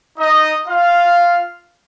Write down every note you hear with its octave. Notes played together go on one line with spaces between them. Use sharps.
D#4 D#5
F4 F5